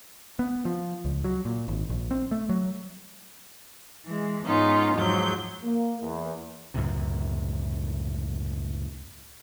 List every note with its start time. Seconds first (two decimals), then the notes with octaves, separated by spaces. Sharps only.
0.39 B3
0.65 F3
1.05 C#2
1.24 F#3
1.45 A#2
1.68 G#1
1.90 A#1
2.11 C4
2.31 A3
2.49 F#3
4.06 E3 G#3
4.45 G#2 B3 C#4 D#4 F4
4.94 E2 G#2 F3 F#3 G6
5.64 A#3
6.01 E2
6.74 C#2 F#2 A2 C3